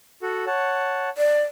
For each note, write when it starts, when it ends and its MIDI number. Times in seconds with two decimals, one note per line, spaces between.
0.22 0.45 66
0.22 0.45 69
0.22 0.45 78
0.46 1.09 73
0.46 1.09 78
0.46 1.09 81
1.18 1.42 74